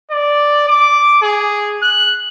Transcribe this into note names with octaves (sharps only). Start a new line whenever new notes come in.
D5
D6
G#4
F#6